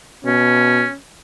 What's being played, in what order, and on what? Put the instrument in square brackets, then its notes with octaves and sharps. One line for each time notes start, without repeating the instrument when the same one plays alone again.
[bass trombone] B2 [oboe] C#4